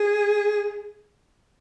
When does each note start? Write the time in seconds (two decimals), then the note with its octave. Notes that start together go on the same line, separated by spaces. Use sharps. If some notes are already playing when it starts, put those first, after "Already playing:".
Already playing: G#4